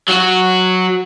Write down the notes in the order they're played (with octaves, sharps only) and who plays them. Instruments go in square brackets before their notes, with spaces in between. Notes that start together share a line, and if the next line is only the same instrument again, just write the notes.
[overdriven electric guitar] F#3 F#4